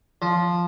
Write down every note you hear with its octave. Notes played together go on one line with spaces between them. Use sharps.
F3